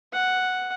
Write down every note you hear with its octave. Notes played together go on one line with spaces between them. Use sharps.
F#5